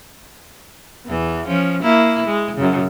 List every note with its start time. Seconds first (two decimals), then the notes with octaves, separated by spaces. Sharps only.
1.07 E2 E3
1.47 F3 C#4
1.83 A#3 E4
2.27 G#3
2.57 F#2 C#3